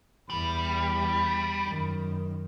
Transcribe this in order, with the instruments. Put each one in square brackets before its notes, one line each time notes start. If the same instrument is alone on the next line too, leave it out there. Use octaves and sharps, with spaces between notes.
[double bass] E2 [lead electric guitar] G3 [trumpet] B5
[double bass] F#2 D#3